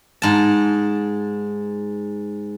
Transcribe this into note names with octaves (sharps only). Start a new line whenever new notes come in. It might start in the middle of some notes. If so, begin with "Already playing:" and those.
G#2 A5